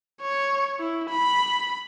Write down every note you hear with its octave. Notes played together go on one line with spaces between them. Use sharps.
C#5
E4
B5